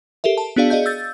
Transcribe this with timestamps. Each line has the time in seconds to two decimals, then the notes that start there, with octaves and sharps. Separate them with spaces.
0.24 G4 A4 A#4 E5
0.38 A5
0.56 B3 D4 F#4 G#4 D5 F5
0.70 G#4 D5 D#5 F5 G6
0.86 E6 G6 A6